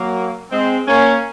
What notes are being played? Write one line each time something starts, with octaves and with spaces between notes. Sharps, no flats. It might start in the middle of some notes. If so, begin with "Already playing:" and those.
Already playing: F#3 A#3
G#3 C4
A#3 C#4